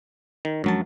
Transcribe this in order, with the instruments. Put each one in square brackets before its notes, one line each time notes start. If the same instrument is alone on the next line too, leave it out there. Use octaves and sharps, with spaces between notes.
[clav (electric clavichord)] D#3
[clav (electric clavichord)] F#2 F#3 A5 [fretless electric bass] F3 G#3 D4